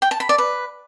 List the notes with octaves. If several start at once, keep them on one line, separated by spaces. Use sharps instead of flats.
G5
A5
B5
D5
B4